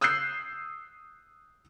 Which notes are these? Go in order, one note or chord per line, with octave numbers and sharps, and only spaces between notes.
D#6 E6 F#6 G6 C7